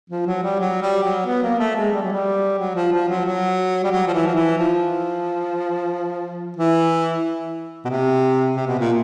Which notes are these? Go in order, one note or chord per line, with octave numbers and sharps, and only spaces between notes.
F3
F#3
G3
F#3
G3
F#3
B3
A#3
A3
G#3
G3
F#3
G3
F#3
F3
F3
F#3
F#3
G3
F#3
F3
E3
F3
E3
F3
E3
B2
C3
C3
B2
A#2